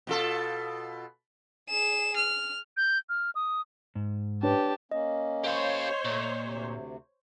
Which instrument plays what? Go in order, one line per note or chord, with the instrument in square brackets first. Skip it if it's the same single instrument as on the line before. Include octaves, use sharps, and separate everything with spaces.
[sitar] B2 F4 A4
[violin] G#4 E7
F6
[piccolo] G6
F6
D#6
[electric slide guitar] G#2
[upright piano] D4 B4 C#5 [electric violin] G4 A5
[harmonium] A#3 C#4 [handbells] D#5
[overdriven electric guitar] G4 F5 [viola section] C5 C#5
[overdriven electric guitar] A#2 [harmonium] A3
[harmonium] D2 C3